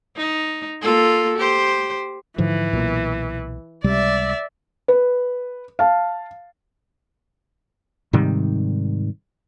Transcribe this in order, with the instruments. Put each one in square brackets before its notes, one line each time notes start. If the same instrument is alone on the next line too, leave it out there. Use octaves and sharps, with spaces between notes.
[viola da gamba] D#4
A#3 F4 A4
G4 C5
[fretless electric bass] G#2 D3 F3 [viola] E3
[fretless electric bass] B1 A#2
[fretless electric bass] C#2 C3 G3 [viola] D5 E5
[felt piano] B4
F5 A5
[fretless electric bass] G#2 C3 D#3 G3